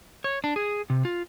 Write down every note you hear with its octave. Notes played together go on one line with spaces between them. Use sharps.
C#5
D4
G#4
C3
F4